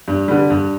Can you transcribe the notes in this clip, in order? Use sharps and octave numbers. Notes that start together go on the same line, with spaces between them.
G2
D3 G3
G2